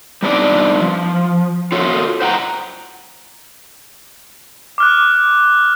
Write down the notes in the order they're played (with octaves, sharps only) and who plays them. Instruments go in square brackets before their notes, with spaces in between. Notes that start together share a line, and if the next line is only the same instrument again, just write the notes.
[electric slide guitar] G3 B3 C4 D4 D#4 D5
F3
F4 F#4 A4 C#5
C5 F#5 G5 A#5
[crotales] D6 F6 F#6